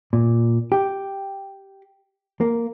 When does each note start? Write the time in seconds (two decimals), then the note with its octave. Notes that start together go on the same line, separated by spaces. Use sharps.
0.13 A#2
0.72 G4
2.41 A#3